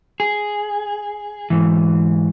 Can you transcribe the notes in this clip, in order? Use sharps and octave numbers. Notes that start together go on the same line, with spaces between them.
G#4
G#2 E3